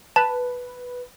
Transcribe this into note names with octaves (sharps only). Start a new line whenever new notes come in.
B4 A5